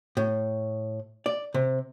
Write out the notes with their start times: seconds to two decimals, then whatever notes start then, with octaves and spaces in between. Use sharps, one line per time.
0.17 A2
1.26 D5
1.54 C3